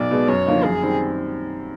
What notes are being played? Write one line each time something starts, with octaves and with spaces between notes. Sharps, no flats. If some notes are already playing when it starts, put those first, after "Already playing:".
Already playing: B1 D5
B2 G#3
F#2 C#5
D3 F3 A#3 D#4
F#2 G#4
D#3 G3 C4